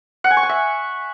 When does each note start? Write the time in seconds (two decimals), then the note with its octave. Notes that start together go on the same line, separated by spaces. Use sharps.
0.24 F#5
0.31 G#5
0.37 C#6
0.43 G#5
0.49 E5